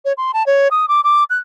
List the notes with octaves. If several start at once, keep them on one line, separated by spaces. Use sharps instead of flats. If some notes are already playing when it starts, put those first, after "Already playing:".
C#5
C6
A5
C#5
D#6
D6
D6
F#6